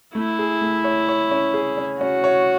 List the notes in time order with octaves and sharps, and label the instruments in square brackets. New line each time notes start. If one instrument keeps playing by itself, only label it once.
[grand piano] A3 [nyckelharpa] E4
[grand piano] G#4
A3
C#5
C#5
C#4
G#4
C#4
[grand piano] C#4 [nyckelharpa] F#4
[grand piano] C#5